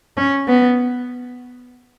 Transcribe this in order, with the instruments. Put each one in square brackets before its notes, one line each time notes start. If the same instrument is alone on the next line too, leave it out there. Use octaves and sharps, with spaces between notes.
[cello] C#4
B3